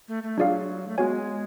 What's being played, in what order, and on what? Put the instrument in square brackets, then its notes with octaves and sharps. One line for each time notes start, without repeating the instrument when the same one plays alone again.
[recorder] A3
A3
[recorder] F#3 [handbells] D4 F4 G#4 D5 F5
[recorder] A3
[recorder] G#3 [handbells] B3 F#4 C#5 G#5